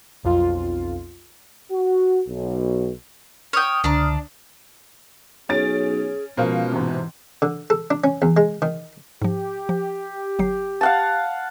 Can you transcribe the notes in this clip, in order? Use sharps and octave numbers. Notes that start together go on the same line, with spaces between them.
B1 F2 F4
F#4
B1
C#5 G5 D#6 F6
C#2 D3 D4 D5 A#5
B1 C#4 G#4 A6 D7
C#2 B2 F3 A#4 C5 F5
G#2 C3 E3
D3
A4
D4
C#4
E2
G#3
D#3
G#2 F3 G4
F3
G1 F#3 C7
F5 F#5 A5